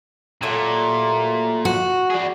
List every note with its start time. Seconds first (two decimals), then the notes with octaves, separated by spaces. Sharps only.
0.43 A#2 F#3 G3 A3
1.65 F#4
2.10 G#4 D5